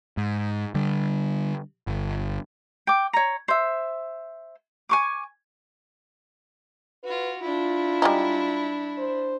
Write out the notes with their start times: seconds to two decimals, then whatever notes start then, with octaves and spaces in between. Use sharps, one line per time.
0.17 G#2
0.75 D3 G3
1.87 G1
2.87 G5 D6
3.13 C#5 A#5
3.48 C5 E5
4.89 G#5 C#6 D6
7.04 F4 F#4 B4
7.42 D4 E4 F4
8.02 G3 G#3 D#4
8.98 C5